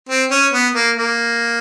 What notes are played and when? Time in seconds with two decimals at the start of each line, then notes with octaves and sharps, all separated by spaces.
0.09 C4
0.31 C#4
0.53 B3
0.75 A#3
0.96 A#3